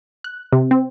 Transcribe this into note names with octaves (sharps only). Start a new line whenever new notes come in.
F#6
C3
C4